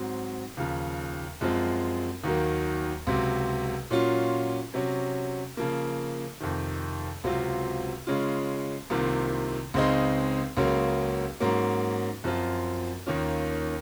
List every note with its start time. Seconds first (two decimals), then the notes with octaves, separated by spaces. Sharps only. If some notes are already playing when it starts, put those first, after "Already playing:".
Already playing: G#2 F#3 C4
0.57 D#2 C#3 F3
1.41 F#2 F3 G#3 C4 F4
2.24 D#2 D#3 F#3 A#3
3.07 C#2 C3 F#3
3.90 A#2 F#3 C#4 F4
4.74 C3 F#3 C#4
5.57 C#3 F3 A#3
6.40 F2 C3 D#3
7.24 C#2 C3 F#3 C4 F4
8.07 C#3 G#3 C#4 F4
8.90 C2 C3 D#3 A#3 F4
9.74 C#2 C#3 G#3 C4 D#4
10.57 C#2 C#3 F#3 A#3 C#4
11.40 G#2 F#3 A#3 C#4
12.24 F#2 F3 C4 F4
13.06 D#2 D#3 A#3 C#4 F4